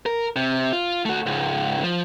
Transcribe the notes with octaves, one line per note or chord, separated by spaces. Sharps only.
A#4
C3
F4
A3 F#4
C#2 G#2
F3